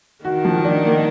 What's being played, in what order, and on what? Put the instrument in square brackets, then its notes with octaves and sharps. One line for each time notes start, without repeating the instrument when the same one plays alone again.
[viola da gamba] D#3 [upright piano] F#4
[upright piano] F3
D4
A#3